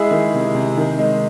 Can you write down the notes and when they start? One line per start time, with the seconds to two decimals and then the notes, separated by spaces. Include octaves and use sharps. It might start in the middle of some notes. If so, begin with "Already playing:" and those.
Already playing: G#3 E4 G#4
0.11 D#3
0.34 C3
0.55 C3
0.77 D#3
0.99 G#3